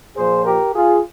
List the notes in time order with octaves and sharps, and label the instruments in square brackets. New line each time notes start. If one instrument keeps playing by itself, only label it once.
[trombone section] A#2 F3 G#4 C5
G4 A#4
F4 G#4